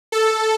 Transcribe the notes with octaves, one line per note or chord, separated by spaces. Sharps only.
A4